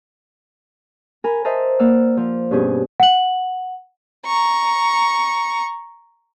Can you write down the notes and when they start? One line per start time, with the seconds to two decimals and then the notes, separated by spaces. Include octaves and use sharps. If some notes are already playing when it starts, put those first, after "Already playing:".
1.24 A#4 G#5 B5
1.45 A#4 C5 D#5 E5 A5 A#5
1.79 A#3 D5 F#5 E6 F6
2.17 F3
2.51 G2 B2 C#4 G4 G#4
3.00 F#5 F#7
4.26 A#5 C#6